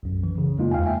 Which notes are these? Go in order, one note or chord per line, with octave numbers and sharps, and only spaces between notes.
B1 F#2
E3
C#3
F#2 G#3 A#3 D#4 F4
E2 F5 G5 G#5
E5 G5